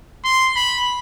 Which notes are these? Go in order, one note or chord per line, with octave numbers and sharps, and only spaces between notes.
C6
B5